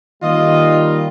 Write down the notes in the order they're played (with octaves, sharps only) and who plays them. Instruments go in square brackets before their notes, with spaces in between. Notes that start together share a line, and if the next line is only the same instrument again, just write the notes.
[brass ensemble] D#3 G3 A#3 [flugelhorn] F4 [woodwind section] D#5